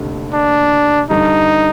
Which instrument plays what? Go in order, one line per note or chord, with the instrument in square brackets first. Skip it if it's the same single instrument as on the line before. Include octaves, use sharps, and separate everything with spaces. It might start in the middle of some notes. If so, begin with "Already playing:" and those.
Already playing: [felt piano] F1 D#2 D3
[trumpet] D4
[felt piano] G2 D3 G3 [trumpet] D#4